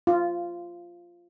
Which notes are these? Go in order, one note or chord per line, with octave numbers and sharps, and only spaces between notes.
F4